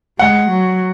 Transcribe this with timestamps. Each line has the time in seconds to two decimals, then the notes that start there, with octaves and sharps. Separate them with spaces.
0.19 G#3 F#5
0.49 F#3